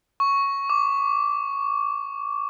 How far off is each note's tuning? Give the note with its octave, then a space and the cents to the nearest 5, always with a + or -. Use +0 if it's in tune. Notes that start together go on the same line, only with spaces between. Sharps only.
C#6 +0
D6 -15